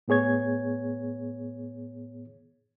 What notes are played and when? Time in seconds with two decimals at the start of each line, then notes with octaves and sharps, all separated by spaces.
0.08 A2 B3 G#4 C#5 G#6